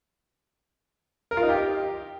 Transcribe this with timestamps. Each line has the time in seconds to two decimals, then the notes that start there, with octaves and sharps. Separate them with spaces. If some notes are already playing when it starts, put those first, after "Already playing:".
1.31 A#4
1.37 F4
1.43 D#4
1.49 G4